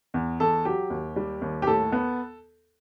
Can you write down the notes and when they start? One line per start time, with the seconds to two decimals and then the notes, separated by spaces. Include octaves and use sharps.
0.14 E2
0.40 E2 A4
0.65 F#3 G4
0.90 D#2
1.16 G3
1.42 D#2
1.62 G4
1.67 A2 A4
1.92 B3